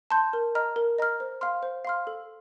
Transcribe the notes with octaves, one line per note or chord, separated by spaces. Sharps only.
A5 C6 G6
A#4
D#5 A#5 F6
A#4
D#5 A#5 F6
C5
F5 C6 F6
C5
F5 C6 F6
A4